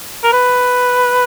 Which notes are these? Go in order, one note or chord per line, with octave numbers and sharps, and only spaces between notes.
A#4
B4